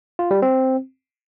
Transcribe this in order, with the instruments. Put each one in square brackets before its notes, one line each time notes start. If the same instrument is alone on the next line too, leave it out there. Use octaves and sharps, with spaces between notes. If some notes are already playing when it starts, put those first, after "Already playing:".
[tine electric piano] F4
G3
C4